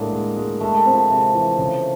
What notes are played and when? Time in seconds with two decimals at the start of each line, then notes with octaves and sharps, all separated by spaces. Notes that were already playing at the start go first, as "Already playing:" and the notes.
Already playing: A2 D3 G#3 A#3
0.12 G#3
0.37 G#3
0.60 G#3 A3
0.77 A3
0.86 C4
0.93 F3
1.10 C3 G#3
1.34 E3
1.58 C#3